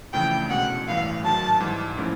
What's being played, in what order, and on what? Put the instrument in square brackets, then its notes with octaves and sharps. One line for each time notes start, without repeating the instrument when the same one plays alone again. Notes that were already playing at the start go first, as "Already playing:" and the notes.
[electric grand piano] F2 C#3 E3 A3 D4 [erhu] G5
[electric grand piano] C2 B2 G#3 C#4 [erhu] F#5
[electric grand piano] A1 G2 E3 A3 [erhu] F5
[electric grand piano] G#2 D#3 F#3 [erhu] A5
[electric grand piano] G#2 E3 G3
A#2 F3 A3 C#4 E4